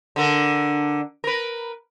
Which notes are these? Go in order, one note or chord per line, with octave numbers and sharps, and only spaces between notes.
D3 D4 A#4
A#4 B4